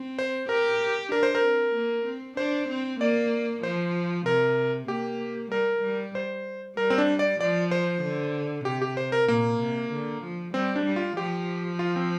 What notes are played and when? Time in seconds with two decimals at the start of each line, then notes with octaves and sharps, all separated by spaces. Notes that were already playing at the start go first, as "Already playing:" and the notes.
Already playing: C4
0.19 C5
0.49 G4 A#4
1.12 D4 A#4
1.23 C5
1.35 A#4
1.44 C4
1.76 A#3
2.06 C4
2.37 D4 C5
2.69 C4
3.00 A#3 D5
3.63 F3 C5
4.26 C3 A#4
4.88 A#3 G4
5.52 G3 A#4
5.83 G3
6.15 C5
6.77 G3 A#4
6.90 C4
6.98 D4
7.19 D5
7.40 F3 D5
7.71 C5
8.03 D3
8.65 C3 G4
8.82 G4
8.97 C5
9.12 A#4
9.28 A#2 A#3
9.60 C3
9.92 D3
10.23 F3
10.54 G3 C4
10.76 D4
10.86 G3
10.96 F4
11.16 F3 G4
11.79 F4
11.96 C4